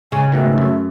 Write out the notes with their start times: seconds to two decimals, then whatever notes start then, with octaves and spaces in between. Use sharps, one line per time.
0.12 C#3 G#3 C#5 G#5
0.32 G#2 B2 D#3 A3
0.58 F#2